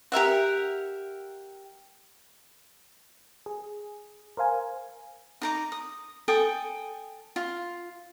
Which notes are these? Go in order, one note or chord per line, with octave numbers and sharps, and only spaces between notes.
G4 A#4 E5 F#5
G#4
A#4 C5 F5 G#5
D#4 A#5 D6
D#6
A4 G5 G#5 D#6
F4